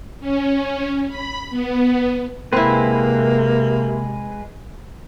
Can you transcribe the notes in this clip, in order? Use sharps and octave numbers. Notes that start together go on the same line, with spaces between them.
C#4
B5
B3
C3 G#3 A#3 C4 E4 B4